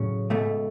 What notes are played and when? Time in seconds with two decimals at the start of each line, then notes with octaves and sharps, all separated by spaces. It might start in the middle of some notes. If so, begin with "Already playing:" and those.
Already playing: A2 C#3 F#3 C#4
0.30 C#2 B2 A3